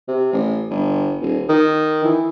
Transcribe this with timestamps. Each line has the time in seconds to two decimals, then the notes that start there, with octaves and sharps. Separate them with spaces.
0.08 C3
0.33 A1
0.71 G1
1.21 D#1
1.49 D#3
2.05 E3